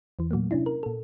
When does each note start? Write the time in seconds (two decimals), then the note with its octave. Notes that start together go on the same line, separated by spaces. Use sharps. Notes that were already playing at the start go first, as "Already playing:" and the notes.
0.19 E2 E3
0.31 A#2 F#3 A3 A#3
0.51 C3 C#4 D4 E4
0.66 A#4
0.83 A#2 A4